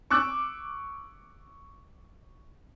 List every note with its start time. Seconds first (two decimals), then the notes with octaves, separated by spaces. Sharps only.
0.10 C#6 D6 E6 F#6